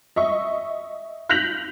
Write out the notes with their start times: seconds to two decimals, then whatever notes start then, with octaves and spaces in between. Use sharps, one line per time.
0.16 D#5 E5 C#6
1.29 F#6 G6 A#6 B6 F7 F#7